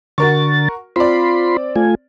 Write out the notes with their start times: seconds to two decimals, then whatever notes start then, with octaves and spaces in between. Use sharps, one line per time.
0.18 D3 F#4 A#4 C#6 A6
0.96 C4 F4 D5 B5 C6
1.76 A3 F4 G#5